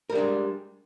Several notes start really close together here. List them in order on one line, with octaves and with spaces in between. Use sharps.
A#4 G3 D4 G#3